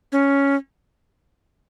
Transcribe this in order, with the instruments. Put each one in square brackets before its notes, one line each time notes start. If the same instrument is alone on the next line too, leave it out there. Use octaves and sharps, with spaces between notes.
[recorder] C#4